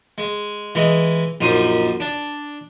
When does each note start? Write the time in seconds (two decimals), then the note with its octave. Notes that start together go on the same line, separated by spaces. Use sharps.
0.18 G#3
0.75 E3 G#3 D#5
1.41 A#1 F#2 D#4 C5 D#6
2.00 D4